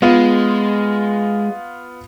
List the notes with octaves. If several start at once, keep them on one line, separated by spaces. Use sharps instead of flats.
G#3 B3 F4